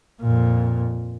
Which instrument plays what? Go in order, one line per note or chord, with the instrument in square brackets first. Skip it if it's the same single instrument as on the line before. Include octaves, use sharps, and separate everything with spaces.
[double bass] F2 A#2